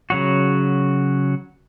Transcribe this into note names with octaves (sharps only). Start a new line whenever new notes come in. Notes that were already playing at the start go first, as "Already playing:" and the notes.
C#3 F#3 F#4